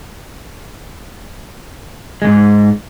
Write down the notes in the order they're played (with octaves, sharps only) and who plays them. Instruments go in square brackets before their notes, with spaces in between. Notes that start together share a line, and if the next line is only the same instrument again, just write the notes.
[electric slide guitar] G#3
F2
G#2